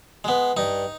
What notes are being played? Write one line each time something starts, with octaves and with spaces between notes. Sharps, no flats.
G#3 B3
G2 D#4